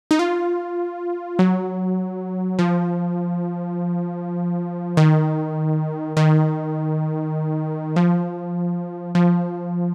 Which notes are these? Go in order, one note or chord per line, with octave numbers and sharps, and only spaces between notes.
D#4
F4
F#3
F3
D#3
D#3
F3
F3